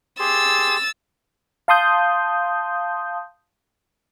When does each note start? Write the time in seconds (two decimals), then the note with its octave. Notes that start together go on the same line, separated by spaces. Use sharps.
0.20 G4 G#4 C6 E6 A6
1.68 F5 A5 C6 D#6 G6